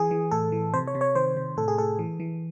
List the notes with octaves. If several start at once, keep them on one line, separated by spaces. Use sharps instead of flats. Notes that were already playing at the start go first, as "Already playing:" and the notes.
Already playing: E3 G#4
E3
A2 A4
E3
C3 C5
C#5
C3
C#5
D#3 C5
C3
A2 A4
G#4
A2 A4
E3
E3